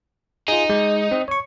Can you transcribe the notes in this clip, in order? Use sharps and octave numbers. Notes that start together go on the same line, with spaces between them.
D#4 F4 G#4
G#3
C4
C#5 C#6